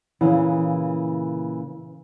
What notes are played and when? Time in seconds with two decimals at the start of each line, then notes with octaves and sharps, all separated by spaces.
0.21 A#2 C#3 E3